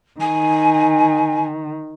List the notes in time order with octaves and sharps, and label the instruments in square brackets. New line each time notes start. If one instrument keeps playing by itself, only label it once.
[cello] D#3 [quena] G#5